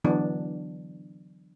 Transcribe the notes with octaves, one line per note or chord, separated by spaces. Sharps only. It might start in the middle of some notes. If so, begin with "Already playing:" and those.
D3 E3 F#3 B3 D4